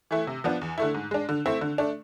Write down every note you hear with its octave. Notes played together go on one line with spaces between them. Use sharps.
E3 A3 E4
C3
F3 B3 D4
E2
D3 A3 E4
G#2
G#3 D4
D3
A3 C4 E4
D3
A3 D4